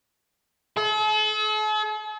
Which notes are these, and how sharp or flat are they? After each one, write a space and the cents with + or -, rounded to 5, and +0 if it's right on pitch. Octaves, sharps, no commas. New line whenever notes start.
A4 -45